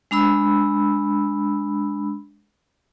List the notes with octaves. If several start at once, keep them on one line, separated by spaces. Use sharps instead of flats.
G#3 D4 B5 E6